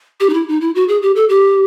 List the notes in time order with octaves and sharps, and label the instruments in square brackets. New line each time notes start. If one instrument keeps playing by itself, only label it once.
[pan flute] G4
D#4
E4
D#4
E4
F#4
G#4
G4
A4
G4